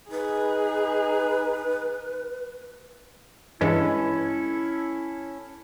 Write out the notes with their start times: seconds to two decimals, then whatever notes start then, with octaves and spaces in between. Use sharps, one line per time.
0.12 D#4 G#4 B4
3.61 G2 E3 G#3 C#4 E4 A4